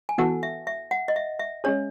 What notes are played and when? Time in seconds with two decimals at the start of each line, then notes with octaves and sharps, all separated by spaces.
0.09 G#5
0.18 E3 B3 F#4 A4 F#5
0.43 E5
0.67 E5
0.91 F#5
1.08 D#5
1.16 E5
1.39 E5
1.64 G#3 C#4 G#4 C#5